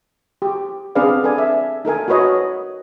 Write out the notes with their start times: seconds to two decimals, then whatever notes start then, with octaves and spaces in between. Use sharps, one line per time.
0.42 G4
0.95 C4 D4 G#4 B4 D5 F5
1.24 A4 B4 D5 G#5
1.38 E5
1.85 D#4 A4 A#4 G#5
2.08 F#4 A#4 B4 C#5 D#5